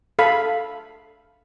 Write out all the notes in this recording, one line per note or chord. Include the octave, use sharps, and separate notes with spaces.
A4 F5 B5